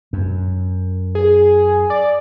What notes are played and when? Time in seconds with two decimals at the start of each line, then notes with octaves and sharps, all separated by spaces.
0.13 F#2
1.15 G#4
1.90 D5